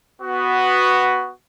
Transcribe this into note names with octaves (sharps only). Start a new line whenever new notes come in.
B3 F#4